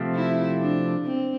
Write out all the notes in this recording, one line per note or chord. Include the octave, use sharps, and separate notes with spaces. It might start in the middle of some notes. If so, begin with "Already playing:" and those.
Already playing: C3 F3 A3 C4
E4
D4
C4